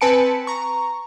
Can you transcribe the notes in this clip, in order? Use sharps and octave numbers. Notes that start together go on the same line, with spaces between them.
C4 B4 G#5 A5 C#7 D7
A#5 C#6